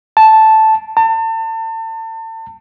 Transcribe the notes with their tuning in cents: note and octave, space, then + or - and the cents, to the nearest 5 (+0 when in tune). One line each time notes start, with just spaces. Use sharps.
A5 -5
A5 +35